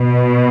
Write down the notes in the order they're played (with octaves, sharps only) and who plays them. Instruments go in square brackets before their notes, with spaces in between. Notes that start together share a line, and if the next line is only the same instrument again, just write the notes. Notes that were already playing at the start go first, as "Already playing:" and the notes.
Already playing: [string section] B2